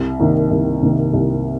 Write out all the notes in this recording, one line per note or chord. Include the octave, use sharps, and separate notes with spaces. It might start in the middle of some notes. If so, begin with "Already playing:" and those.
Already playing: C2
C3 D#3 A#3
C2
C3 D#3 A#3
C2